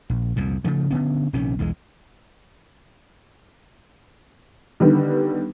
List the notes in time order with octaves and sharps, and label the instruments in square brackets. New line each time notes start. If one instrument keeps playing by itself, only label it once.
[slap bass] A#1
C2 F2 A#2
C#3 F3 A3
D3 B3 C#4
A#1 C3 D#3 C#4
B1 E2 F#3 G#3
[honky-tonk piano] D3 D#3 G3 B3